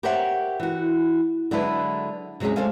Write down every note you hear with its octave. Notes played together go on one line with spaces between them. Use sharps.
G4 A#4 C5 C#5 E5 F#5
E3 F#4
D3 F#3 G#3 E4 A4 B4
C3 F#3 G#3 C#4 G#4
D2 G#3 A4 C5 F5 G#5